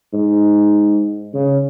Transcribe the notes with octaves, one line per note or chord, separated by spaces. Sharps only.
G#2
C#3